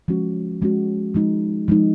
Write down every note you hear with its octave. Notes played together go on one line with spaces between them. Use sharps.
F3 G#3 C#4 F#4
F3 G#3 C#4 F#4
F3 G#3 D#4
F3 G#3 D#4